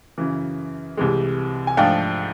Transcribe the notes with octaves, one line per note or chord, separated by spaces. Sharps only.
F#2 C#3 E3
C2 C3 E3 G#3
G#5
G#2 F3 A3 D4 F5 G5